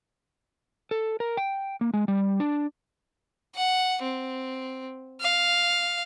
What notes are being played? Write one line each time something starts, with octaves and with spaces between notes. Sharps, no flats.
A4
A#4
G5
A#3
G#3
G3
D4
F#5
C4
F5